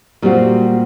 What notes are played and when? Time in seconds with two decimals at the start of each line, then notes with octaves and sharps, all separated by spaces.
0.22 A#2 G3 C4 F#4